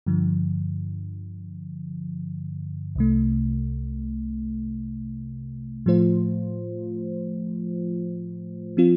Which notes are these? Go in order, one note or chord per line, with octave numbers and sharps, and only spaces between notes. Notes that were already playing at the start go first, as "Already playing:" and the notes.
G2 D3 F3
C2 C3 A3
A2 F3 A3 F4 C5
F3 C4 F4